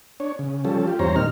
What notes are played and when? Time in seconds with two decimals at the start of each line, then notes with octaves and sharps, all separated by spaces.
0.20 D4 C#5
0.39 C#3
0.65 F3 G3 C#4 A4
0.87 F4 G4
0.99 E2 G2 C4 C5 C#5 A#5
1.16 A#2 D#3 G3 D#4 F6